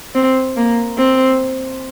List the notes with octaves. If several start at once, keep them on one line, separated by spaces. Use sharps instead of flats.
C4
A#3
C4